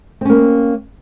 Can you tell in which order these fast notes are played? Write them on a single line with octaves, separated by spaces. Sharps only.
C4 C#4 A#3